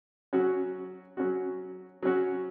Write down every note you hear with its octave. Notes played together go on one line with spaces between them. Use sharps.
F#3 C#4 F#4
F#3 C#4 F#4
F#3 C#4 F#4